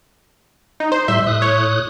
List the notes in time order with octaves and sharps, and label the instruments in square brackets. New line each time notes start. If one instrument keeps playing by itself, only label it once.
[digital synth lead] D#4
C5
[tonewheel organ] A2 G3 C6 [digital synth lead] E5
[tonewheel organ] A2 D#6 F#6
[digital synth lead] C#5